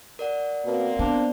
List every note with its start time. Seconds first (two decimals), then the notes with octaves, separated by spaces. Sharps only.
0.19 A#4 D5 F#5
0.65 B2 A#3 C4
0.99 B3 D4 C5 D5